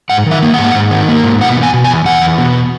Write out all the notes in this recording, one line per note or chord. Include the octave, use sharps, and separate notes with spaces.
G#2 F#5
D#3 E5
A#3
G#2 F#5
G#2
D#3
A#3
G#2
B2 F#5
E2
G#5
B2
G#5
E2
E2 F#5
E2
B2